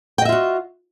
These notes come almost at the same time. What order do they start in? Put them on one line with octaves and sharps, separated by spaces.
G5 D#5 E5 F4 F#4